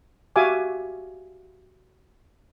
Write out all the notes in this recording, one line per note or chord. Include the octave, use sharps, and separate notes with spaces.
F#4 G4 E5 F5 G#5 D6